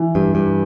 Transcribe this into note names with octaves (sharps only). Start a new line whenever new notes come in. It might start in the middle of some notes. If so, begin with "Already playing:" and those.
Already playing: E3
G2
G2